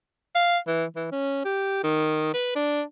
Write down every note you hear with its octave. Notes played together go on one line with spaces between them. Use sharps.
F5
E3
E3
C#4
G4
D#3
B4
D4